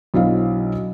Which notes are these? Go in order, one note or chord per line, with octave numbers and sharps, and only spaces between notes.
B1 F#3 D4 E4 C5 F5